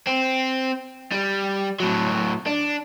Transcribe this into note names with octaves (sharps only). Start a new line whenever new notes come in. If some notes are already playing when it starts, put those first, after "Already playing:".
C4
G3
A2 F#3
D4